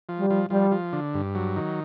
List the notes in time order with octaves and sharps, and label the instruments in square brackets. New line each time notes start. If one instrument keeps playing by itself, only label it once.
[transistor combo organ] F3
[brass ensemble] G3
[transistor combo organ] F3
[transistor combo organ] F3 [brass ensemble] G3
[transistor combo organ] F3
D3
G2
F#3
D#3